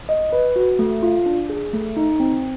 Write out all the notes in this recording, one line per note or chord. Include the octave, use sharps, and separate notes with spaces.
D#5
B4
F#4
A3
F4
D4
G#4
A3
D#4
C4